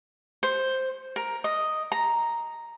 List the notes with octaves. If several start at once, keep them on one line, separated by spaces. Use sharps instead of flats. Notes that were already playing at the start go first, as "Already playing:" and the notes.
C5
A#4
D#5
A#5